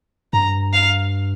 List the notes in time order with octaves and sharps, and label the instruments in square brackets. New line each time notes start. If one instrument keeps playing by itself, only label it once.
[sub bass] G2 [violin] A#5
[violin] F5